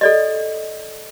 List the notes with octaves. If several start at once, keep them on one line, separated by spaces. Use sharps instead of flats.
A4 D5 D#5